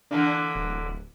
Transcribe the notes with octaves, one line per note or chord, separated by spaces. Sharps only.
D3 E3 A#3 D4
D1